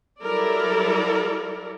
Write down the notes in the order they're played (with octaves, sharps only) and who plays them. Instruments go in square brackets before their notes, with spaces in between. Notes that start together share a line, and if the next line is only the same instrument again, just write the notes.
[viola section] F#3 G3 E4 A4 A#4 D5